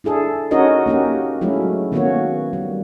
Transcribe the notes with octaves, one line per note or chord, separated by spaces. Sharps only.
D4 E4 G#4 A4
C#4 D#4 F#4 A#4 C#5 D#5
A#3 C#4 F#4 G4
F#3 G#3 A3 C#4 E4
D#3 A#3 B3 C#4 F#4 C#5
G3